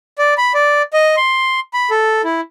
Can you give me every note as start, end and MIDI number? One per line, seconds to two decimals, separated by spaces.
0.18 0.34 74
0.38 0.52 83
0.54 0.82 74
0.93 1.15 75
1.17 1.60 84
1.73 1.90 83
1.90 2.22 69
2.24 2.41 64